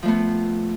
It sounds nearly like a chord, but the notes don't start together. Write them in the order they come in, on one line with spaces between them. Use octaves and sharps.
F3 A3 B3